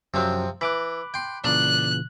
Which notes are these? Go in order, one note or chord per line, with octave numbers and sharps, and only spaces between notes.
F#2 C3 F3 F#3 C4
E3 B5 D6 F#6
G5 C6
A#2 C#3 E3 D4 F#6